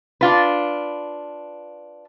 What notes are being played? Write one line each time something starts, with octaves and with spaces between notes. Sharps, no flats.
D4 F4 B4